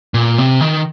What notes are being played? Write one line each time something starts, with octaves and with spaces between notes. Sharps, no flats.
A#2
C3
D#3